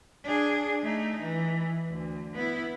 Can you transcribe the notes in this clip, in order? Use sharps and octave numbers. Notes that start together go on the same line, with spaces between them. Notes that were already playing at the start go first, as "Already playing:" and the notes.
D4 G#4
A3 D#4
E3
D2
B3 E4